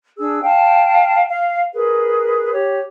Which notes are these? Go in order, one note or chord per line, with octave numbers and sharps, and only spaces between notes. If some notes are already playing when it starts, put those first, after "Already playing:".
D4 G#4 E6
F5 G5 A5
F5
G#4 A#4 B4
G4 C#5